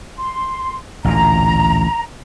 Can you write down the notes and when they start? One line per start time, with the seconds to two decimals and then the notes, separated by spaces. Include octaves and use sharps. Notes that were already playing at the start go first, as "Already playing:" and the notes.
0.17 C6
1.05 A1 D2 A#2 A#5